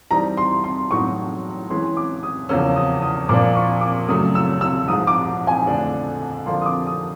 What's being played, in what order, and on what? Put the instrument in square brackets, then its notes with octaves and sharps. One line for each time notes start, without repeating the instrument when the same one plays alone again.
[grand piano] E3 G3 C4 D#4 [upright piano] A#5
[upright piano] C6
C6
[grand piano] A2 F#3 B3 D#4 F#4 [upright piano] C#6
[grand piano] E3 G#3 C#4 [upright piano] C6
[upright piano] D6
D#6
[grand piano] E2 C#3 F3 A#3 C#4 [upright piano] E6
[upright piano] D#6
D#6
[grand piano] A#2 F3 A#3 D4 [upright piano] D6
[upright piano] C#6
D6
[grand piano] F#2 C#3 F#3 A3 [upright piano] D#6
[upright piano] E6
E6
[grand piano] G#2 F3 G#3 [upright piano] D#6
[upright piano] D6
G#5
[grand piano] F2 D3 F3 A3 D4
[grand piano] D3 F3 A#3 [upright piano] C6
[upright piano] D#6
D6
D#6